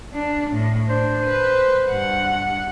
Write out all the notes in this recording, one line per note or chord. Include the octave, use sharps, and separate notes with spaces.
D4
A2
D4 C5
B4
G2 F#5